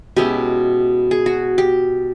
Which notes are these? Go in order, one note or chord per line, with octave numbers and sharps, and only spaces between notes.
B2 G#3 C#4 E4 G4
G#4
F#4
G4